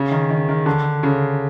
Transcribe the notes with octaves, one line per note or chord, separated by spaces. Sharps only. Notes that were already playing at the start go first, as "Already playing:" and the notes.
Already playing: C#3
D#3
D#3
D#3
D3
C#3